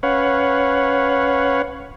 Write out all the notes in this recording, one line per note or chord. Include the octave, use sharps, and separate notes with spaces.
C#4 B4 C#5 F5 F#5